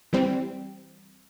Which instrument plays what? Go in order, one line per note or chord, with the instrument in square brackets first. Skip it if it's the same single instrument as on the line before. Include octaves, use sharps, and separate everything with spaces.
[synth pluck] E3 G3 C4